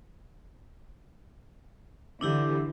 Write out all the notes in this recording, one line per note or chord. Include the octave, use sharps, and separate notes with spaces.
D3 E3 D4 E4 G4